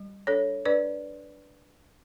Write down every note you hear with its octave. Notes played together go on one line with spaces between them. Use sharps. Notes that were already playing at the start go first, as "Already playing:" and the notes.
Already playing: G3
D4 A4 C#5
D4 B4 D5